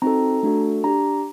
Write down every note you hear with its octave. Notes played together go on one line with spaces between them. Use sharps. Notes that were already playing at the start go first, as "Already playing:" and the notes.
C4 D#4 F#4 A4 A#5
A3 D4 F#4 A4
D4 G4 A#5